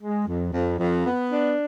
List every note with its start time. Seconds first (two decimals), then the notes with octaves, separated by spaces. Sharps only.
0.01 G#3
0.27 F2
0.53 F2
0.79 F2
1.05 B3
1.31 D4